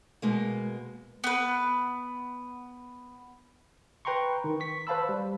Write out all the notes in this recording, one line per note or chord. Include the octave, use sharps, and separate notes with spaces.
B2 G#3 A#3
B3 B4
B4 G5 A#5 C6 C#6
D#3
C#6 B6
B4 C5 F5 A5 B5 E6
G3